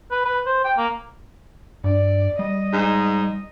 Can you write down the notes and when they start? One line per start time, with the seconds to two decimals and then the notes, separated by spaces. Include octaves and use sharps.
0.12 B4
0.25 B4
0.46 C5
0.65 G5
0.78 A#3
1.84 G2 D5
2.39 G3 D#5
2.73 G#2